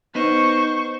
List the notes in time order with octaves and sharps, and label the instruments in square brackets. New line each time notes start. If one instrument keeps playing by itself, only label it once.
[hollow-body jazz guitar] B3 D#4 [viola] C5 C#6